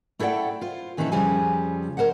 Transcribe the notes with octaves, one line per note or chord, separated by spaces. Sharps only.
A3 E4 A4 D5 F#5 G5
F4 C5
A#2 D#3 E3 C#4 E4 A4
F2 C#3 F3 G3 G#5
A#4 C5 D#5 F#5